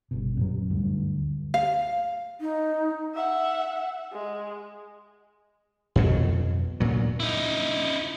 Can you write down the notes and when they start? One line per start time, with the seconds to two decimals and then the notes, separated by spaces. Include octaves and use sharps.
0.11 G1 B2
0.37 F#2 A#2 F#3
0.70 D2 G2
1.54 F5
2.41 D#4
3.15 E5 F#5
4.13 G#3
5.96 F2 B2 F#3
6.80 D2 A#2 F#3
7.20 D#4 E4